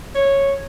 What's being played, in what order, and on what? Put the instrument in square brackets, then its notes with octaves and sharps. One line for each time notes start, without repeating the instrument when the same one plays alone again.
[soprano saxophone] C#5